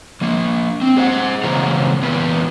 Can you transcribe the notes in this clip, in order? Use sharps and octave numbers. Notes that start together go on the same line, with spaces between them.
F3 A#3
C4 G5
G#4 C5 F#5
C#3 E3 A#3 F4 C5 A#5
A#2 E3 B3 B4